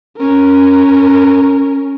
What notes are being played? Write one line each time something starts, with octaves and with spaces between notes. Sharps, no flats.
C#4 A#4